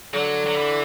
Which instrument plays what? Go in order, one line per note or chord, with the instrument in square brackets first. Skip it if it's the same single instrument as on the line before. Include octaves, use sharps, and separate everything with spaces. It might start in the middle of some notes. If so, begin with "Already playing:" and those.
[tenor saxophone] D3 [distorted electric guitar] F#3
[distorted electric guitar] F#3
E3